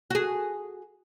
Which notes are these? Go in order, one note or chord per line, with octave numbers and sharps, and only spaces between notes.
F#4 G#4